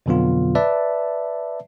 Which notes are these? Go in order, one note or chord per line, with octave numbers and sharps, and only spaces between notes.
F2 B2 D3 F#3 B3 F4
B4 D5 E5 A5